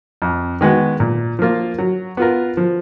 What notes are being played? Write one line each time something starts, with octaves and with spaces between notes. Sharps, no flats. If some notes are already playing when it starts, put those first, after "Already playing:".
F2
D#3 G#3 B3 F#4
A#2
F3 A#3 F4
F#3
B3 F4 A#4
F3